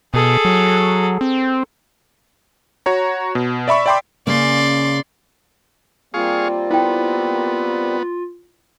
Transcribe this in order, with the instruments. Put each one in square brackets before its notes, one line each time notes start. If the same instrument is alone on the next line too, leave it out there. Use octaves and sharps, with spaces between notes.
[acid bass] B2 [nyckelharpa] G#4 A4
[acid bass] F#3
C4
[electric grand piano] F#4 C#5 A#5
B2
D5 E5 B5 C#6
D5 E5 G5 B5 C6 D6
[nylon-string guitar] C#3 A#3 C#4 [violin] D5 C6
[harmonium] G3 A#3 C4 [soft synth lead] F4 [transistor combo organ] G#4 F5 C#6
[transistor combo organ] B3 [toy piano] E4 G5